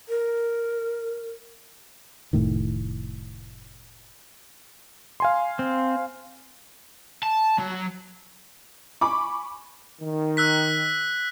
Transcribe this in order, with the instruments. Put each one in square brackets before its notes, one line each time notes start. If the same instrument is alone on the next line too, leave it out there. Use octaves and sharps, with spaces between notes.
[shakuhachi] A#4
[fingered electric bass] F1 A2 D#3
[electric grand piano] F5 G#5 C6
[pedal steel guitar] C4
[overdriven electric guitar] A5
F#3
[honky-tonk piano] G#5 B5 C#6 D6
[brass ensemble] D#3
[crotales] E6 F#6 B6